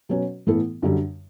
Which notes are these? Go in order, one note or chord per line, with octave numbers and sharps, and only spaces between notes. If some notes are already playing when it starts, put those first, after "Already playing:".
B2 F#3 C#4 F#4 B4
A2 E3 B3 E4 A4
F#2 D3 G3